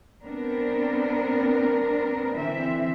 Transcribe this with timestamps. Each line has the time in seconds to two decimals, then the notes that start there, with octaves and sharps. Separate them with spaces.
0.25 B3 C4 D4 A#4
2.36 D3 E3 C4 E5